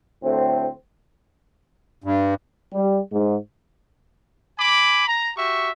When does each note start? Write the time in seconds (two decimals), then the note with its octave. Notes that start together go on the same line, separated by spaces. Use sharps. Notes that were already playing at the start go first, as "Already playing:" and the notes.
0.23 D2 A2 C4
2.04 G2
2.73 G3
3.13 G#2
4.59 G#5 B5 D6
5.08 A#5
5.36 F#4 G4 E5 C#6